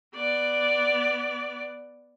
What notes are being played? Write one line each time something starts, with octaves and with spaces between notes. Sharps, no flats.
B3 D5